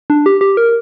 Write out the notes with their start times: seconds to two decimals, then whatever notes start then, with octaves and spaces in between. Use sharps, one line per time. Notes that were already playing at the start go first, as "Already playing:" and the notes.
0.10 D4
0.26 G4
0.41 G4
0.57 A#4